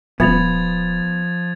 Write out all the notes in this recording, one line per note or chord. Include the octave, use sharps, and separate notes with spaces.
D#1 F3 B3 G#6 A6 F7